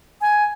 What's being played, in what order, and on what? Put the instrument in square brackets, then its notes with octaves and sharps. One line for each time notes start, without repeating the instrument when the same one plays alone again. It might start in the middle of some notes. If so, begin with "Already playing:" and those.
[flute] G#5